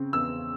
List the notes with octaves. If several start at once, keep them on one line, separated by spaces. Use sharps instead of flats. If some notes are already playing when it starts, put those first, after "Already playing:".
Already playing: C#3 C4
E2 E6